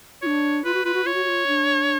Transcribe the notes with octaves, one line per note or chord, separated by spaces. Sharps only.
D4 F4 C#5
F4 B4
F#4
F4 B4
F#4
F4 C#5
F#4
F#4
F4
D4